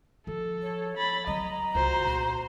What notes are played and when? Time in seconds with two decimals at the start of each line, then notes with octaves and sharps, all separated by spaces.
0.27 F3 A4
0.62 C#5
0.97 B5 A6
1.27 F#3 C4 D#5 A#5
1.75 C2 F4 F#4 C5
2.05 A#1